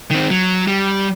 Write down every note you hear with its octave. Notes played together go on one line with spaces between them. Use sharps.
D#3 C4
F#3
G3